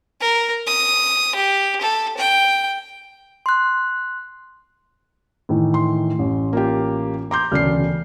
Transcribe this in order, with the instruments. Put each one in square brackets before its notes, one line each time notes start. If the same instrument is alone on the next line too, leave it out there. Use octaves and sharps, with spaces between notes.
[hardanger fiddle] A#4
D#6
G4
A4
G5
[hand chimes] C6 F#6
[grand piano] A2 D#3 E3
[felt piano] C6
[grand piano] A1
[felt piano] A#3 F4 G4
[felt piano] A#5 C6 G6 [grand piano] D6
[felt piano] E1 D5 C7 [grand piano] D2 C#3 F6